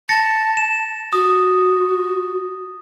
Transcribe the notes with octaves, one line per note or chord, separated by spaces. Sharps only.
A5 A6 A#6 C#7
E7
F#4 D#6